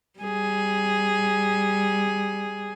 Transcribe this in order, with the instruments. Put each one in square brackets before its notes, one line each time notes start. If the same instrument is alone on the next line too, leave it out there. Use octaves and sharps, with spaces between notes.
[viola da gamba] G3 G#4